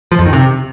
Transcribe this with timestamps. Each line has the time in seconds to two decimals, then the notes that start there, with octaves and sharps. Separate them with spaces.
0.12 F3
0.19 F2
0.26 D#3
0.33 C3